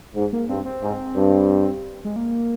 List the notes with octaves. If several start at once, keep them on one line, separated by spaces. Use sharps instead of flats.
G#2
A#3
G2 C4
C4
G#2
G2
G#3
A#3